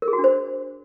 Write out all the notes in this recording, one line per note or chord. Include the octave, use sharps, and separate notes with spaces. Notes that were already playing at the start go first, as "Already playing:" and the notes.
A#4
G#4
F#4
D4
C5